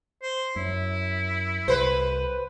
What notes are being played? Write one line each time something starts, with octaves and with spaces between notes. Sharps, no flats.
C5
F#2 E4
C2 B4 C5